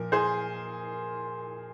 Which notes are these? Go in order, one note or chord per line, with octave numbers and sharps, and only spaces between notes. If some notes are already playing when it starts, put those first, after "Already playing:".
Already playing: A#2 F3 A#3 A#4
G#4 C5